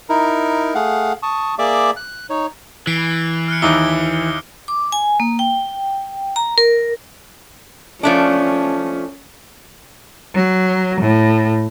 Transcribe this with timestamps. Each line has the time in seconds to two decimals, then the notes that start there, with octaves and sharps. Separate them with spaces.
0.09 D#4 E4 A#4
0.75 A3 G#4 F5 F#5
1.23 A5 C#6 D#6
1.59 A#3 G#4 D5 E5 D6
1.96 F#6
2.30 D#4 C#5
2.87 E3 B6 C7 D7
3.48 F6 F#6 C#7
3.62 D#2 D#4 E4 D6 G7
4.68 D6
4.92 G#5
5.20 A#3
5.39 G5
6.36 A#5
6.58 A#4
8.03 F3 A3 C#4 D4
10.35 F#3
11.01 A2